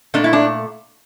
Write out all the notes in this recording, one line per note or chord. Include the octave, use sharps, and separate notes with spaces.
A#2 A3 D4
E4
D4